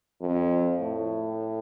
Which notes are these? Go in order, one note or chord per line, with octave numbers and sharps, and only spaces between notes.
F2
A2